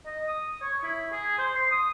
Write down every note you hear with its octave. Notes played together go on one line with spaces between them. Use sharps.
D#5
D#6
C#5
E4
G#4
C5
C6
D#6